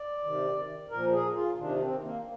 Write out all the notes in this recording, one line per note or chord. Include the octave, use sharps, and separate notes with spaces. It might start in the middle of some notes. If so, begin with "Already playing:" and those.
Already playing: D5
C3 D#3
A#2 F3 A#4
G#4
F4
C3 D#3 D4
C4
A#3